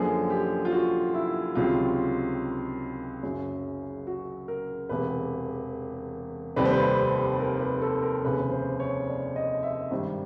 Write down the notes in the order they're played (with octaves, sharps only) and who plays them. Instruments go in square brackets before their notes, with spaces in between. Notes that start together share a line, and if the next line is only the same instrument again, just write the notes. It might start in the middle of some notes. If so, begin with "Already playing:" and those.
Already playing: [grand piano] F#2 D3 F3 A#3 G#4
G4
F4
F#4
E4
C#2 C3 D#3 F#3 F4
F#1 F#2 C#3 F#3
F#4
A#4
E1 E2 C3 B4
F1 D#2 D#3 G3 C4 B4
C5
B4
A#4
B4
A4
A#4
F1 D#2 C#3 B4
C5
C#5
D5
D#5
E5
G#1 G2 D#3